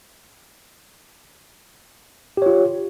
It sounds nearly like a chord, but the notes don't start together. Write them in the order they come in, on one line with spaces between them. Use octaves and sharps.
G4 C#5 F4